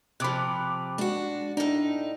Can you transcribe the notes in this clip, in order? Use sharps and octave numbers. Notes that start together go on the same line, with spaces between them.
C3 F3 B5 D6 F#6
G#3 D4 F#4
A2 D4 D#4